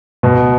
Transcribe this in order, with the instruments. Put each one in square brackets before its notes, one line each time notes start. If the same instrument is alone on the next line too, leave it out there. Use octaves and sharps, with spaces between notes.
[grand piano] B2